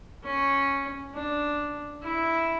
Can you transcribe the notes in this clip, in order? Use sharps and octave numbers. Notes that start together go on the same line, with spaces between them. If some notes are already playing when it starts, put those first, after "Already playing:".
C#4
D4
E4